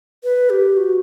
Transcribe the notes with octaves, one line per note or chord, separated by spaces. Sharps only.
B4
G4
F#4